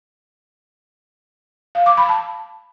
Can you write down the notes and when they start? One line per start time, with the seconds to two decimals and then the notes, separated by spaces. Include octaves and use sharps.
1.75 F5
1.86 D6
1.97 B5
2.09 A5